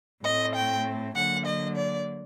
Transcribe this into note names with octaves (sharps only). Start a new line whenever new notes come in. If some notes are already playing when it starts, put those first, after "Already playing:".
A2 A3 C4 D#5
G5
D3 F#3 A#3 F#5
D#5
D5